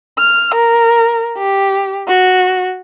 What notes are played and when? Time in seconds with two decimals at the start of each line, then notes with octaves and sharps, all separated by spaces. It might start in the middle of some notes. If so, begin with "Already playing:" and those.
0.18 F6
0.54 A#4
1.38 G4
2.07 F#4